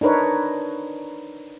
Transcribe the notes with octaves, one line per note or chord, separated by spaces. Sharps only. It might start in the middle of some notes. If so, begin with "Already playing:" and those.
D4 D#4 A#4 B4 C#5